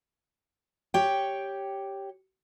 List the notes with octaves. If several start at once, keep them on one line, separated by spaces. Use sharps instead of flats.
G4 C#5 G5